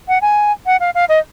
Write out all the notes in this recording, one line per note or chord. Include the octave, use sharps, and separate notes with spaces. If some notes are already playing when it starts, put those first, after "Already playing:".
F#5
G#5
F#5
F5
F5
D#5